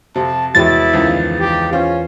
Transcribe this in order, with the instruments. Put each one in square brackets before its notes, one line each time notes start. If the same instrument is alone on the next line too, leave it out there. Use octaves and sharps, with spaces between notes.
[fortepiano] F2 C3 [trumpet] A5
[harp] E2 G#3 [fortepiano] F#3 G4 [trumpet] E4 [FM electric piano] A6
[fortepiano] C#2 D#3 F3
[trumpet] G4
[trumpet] C#4 [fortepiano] F4 C5